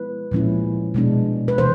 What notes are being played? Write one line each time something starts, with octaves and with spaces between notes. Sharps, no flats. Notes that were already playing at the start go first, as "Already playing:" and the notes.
Already playing: F3 G#3 B3 E4 B4
A#2 F3 G#3 C#4 E4
B2 G#3 B3 D4
B4
C3 E3 A3 C5